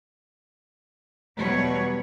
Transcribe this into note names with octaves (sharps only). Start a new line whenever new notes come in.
E2 B2 F#3 G3 B4 C#5